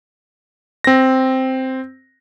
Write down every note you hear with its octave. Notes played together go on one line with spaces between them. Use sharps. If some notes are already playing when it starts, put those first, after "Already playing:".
C4 A#6